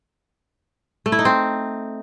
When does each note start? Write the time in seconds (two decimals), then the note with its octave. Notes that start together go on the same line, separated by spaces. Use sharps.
1.06 A3
1.12 E4
1.19 D#4
1.25 C4